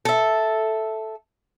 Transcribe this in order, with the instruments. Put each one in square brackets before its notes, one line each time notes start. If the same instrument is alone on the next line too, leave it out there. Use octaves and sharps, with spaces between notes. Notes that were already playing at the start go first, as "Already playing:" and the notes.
[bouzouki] A4 E5